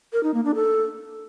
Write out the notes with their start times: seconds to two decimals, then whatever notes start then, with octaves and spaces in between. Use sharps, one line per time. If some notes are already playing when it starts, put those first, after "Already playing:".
0.13 A#4
0.23 D#4
0.34 A#3
0.45 D4
0.55 A4